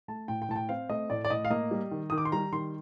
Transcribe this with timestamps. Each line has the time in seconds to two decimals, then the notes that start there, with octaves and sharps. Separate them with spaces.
0.08 A3 A5
0.28 A2 G5
0.42 G5
0.49 A2 A5
0.56 G5
0.69 C4 F5
0.89 A3 D#5
1.10 A2 D5
1.25 D5
1.30 A2 D#5
1.45 F5
1.50 A#3 D#5
1.71 G3
1.91 D#3
2.10 D#3 D#6
2.18 D6
2.25 C6
2.32 G3 A#5
2.52 D#3 C6